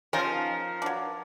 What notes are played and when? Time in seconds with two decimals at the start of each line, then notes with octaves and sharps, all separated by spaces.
0.13 F3 C#4 D#4 F4 A#4
0.82 F#3 D4